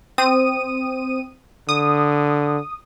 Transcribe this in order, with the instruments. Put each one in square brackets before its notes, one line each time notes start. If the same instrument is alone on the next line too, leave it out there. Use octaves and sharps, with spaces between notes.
[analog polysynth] C4 D#6 D#7
[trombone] D3 [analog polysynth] D#6